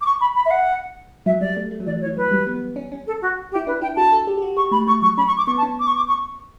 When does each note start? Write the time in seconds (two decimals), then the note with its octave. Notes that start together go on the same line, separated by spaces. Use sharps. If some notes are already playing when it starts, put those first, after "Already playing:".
0.01 D6
0.06 C#6
0.21 B5
0.36 B5
0.46 E5
0.51 F#5
1.26 F#3 E5
1.41 G3 D5
1.57 A3
1.71 A3
1.80 F#3
1.87 E3 D5
1.96 F#3
2.01 C#5
2.06 E3
2.17 F#3 B4
2.31 G3
2.47 B3
2.76 C#4
2.92 C#4
3.07 A4
3.22 F#4
3.52 G4
3.56 E4
3.67 D4 B4
3.82 E4 G5
3.96 F#4 A5
4.12 A4
4.27 G4
4.38 G4
4.42 F#4
4.57 G4 C#6
4.71 A3 B5
4.87 A3 C#6
5.02 F#3 C#6
5.18 C#4 B5
5.27 C#6
5.37 D6
5.47 B3 C#6
5.58 A5
5.63 C#4
5.80 D6
5.87 C#6
5.97 D6
6.08 C#6